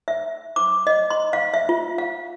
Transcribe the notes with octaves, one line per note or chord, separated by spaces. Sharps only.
E5
D6
D#5
C6
F5
E5
F4
F5